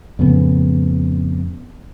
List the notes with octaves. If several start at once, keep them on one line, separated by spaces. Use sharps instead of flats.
F2 A2 C#3 B3